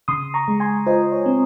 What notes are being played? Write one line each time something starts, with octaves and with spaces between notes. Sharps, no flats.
C#3 C6 D#6
A#5 C#6
G#3
G#5 C6
F4 C5 D#5
C#5
C4